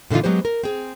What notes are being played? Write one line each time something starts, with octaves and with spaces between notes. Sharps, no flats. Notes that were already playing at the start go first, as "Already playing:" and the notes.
A#2 D3 E3 D#4 F4
F#3 G#3 B3 G4 C5
A#4
C4 G#4